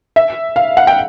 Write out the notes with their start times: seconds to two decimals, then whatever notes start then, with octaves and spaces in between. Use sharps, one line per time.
0.16 E5
0.56 F5
0.77 F#5
0.87 G5